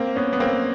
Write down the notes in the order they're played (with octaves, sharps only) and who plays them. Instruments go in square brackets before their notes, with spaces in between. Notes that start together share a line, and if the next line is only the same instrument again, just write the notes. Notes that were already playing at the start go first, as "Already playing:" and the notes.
Already playing: [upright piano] A#3 C4
B3 C#4
B3
A#3 C4